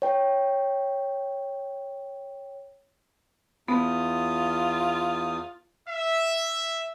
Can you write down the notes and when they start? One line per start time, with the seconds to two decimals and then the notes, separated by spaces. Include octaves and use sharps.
0.02 C#5 G5
3.68 E2 B3 F4 D#6
5.89 E5